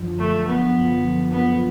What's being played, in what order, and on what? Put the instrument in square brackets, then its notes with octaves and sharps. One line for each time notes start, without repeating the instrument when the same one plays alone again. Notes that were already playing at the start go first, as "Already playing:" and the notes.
Already playing: [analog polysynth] F#2 D3 F3
[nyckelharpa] A3
B3
B3